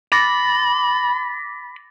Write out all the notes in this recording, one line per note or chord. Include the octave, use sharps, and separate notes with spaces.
B5 D6 A6 A#6